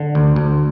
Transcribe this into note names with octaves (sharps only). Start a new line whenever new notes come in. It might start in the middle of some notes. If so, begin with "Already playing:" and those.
Already playing: D3
D2
D2